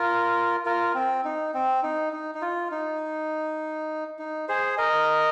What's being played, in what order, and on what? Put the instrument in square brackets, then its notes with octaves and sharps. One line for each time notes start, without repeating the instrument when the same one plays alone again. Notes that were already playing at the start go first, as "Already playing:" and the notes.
Already playing: [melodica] F4 A#4
F4 A#4
C4
D#4
C4
D#4
D#4
D#4
F4
D#4
D#4
G#4 C5
A#4 D#5